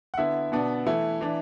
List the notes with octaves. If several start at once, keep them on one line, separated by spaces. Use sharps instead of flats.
F#5
D3 B3 E4 E5
B2 B3 D4
E3 A3 E4
E3 D4